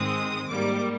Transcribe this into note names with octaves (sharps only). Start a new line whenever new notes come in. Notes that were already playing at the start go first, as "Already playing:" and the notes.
Already playing: G#2 D#3 G#3 C4 D#6
G#2 G3 A#3 D6